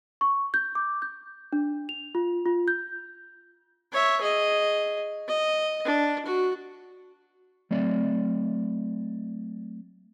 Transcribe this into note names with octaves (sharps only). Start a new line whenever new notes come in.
C#6
G6
D6
G6
D4
F7
F4
F4
G6
C#5 E5
G#4 D#5
D#5
D4
F#4
F#3 A3 C4 D5